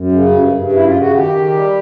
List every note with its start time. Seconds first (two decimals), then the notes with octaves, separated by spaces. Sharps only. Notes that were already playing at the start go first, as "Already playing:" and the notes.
Already playing: F#2
0.12 C#3
0.31 G2
0.52 G2
0.72 F#2 E4
0.85 F4
0.93 C#3
0.99 F#4
1.12 D#3 G4
1.33 D#3
1.53 G3